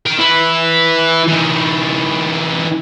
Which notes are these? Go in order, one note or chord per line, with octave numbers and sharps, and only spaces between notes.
A#4 G5
E4 B4
E3 D#4